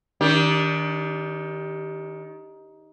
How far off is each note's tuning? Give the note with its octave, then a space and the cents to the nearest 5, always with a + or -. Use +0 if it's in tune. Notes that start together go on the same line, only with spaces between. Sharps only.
D#3 +15 D4 -20 G4 +0